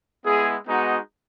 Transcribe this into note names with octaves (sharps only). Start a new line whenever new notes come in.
G#3 B3 E4 G#4
G#3 B3 D#4 F#4